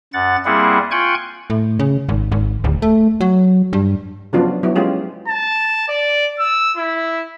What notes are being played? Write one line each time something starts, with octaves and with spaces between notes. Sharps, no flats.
F#2 F#5 A6
G3 A#3 C4 E4 G#4 F#5
F4 G5 G#5 C#6 F#6 G#6
A2
C#3
G#1
G#1
D1
A3
F#3
G2
C#3 F3 F#3 B3 D4 F4
F#3 B3 E4
G#3 C#4 F4 G4 G#4
A5
D5
E6
E4